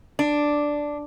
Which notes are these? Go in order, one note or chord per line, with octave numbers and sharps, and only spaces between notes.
D4